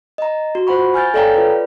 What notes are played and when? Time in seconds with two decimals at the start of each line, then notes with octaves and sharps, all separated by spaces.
0.18 D#5 A#5
0.55 F#4
0.67 F4 C5 F#5 B5 C#6
0.94 G#5 F6 G6 A6
1.14 A4 C#5 D5 F5 G5 A#5
1.36 F4 B4 D5